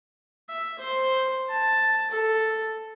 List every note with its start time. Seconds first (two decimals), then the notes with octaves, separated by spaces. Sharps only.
0.49 E5
0.79 C5
1.49 A5
2.11 A4